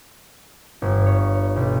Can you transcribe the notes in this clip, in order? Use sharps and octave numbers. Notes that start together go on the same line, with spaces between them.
G1
C#5
B1